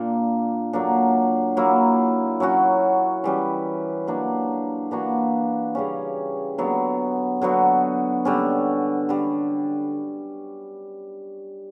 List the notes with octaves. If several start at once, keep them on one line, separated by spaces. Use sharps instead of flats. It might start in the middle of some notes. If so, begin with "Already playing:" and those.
Already playing: A#2 A#3 D4
D3 F#3 A#3 D4
F#3 A#3 E4
F#3 C#4 F#4
E3 G3 C#4
F#3 A#3 D4
E3 A#3 D4 F#4
C#3 G3 C#4
D3 F#3 B3
D3 F#3 B3 F#4
D3 G3 C#4
D3 G3